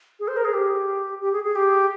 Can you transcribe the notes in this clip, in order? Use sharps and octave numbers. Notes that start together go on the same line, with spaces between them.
G#4
C5
A#4
G#4
G4
G4
G#4
G#4
G4